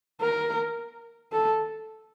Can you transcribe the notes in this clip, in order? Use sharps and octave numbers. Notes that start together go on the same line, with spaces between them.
A#4
A4